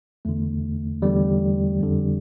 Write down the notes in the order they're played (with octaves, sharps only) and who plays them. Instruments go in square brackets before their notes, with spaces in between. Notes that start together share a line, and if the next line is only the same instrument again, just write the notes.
[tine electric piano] E2 D3 A3
E2 D3 G3
F2 D3